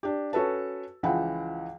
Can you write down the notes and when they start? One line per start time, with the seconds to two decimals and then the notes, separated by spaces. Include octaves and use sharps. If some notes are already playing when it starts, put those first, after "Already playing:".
0.03 D4 G4
0.33 C#4 F#4 A4 B4 A5
1.03 C#2 E3 F3 F#5 G5 B5